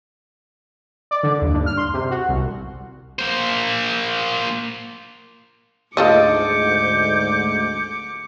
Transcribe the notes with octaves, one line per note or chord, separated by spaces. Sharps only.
D5
D3
D#2
G2
F6
C6
C3
F#4
C2
A#3 C5
D2 G#2 F4 A4 D#5 D6 G6 C#7